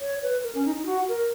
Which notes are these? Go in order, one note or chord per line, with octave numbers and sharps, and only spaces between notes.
C#5
B4
A#4
C#4
D#4
D#4
F#4
A#4